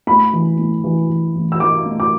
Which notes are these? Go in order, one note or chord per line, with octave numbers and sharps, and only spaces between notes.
A2 B5
E3
A2
E3
E3
A1
E6
A1 D6
A2
D6